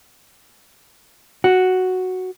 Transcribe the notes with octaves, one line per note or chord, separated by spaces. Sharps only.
F#4